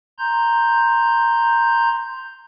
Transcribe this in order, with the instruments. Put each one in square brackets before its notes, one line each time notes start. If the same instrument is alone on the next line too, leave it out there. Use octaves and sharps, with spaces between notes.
[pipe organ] A#5 C6 G6